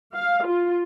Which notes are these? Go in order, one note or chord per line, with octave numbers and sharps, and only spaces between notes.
F5
F4